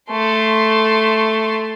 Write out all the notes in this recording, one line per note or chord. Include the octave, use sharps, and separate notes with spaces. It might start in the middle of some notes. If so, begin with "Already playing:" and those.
A3 C6